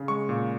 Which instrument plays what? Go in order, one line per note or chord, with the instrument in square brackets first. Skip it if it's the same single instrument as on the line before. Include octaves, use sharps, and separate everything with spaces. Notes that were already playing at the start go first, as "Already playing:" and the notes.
Already playing: [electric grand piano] C#3
G#3 C#6
A#2